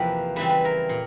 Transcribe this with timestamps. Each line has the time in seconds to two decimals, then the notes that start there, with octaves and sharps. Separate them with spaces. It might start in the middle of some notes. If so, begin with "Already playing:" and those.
Already playing: E2 C3 F3 A#3 B4
0.36 C#3 E3 G3 C4 B4
0.50 B4
0.65 A#4
0.89 A#2